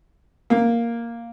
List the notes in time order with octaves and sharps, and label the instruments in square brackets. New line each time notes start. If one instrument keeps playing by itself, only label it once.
[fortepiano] A#3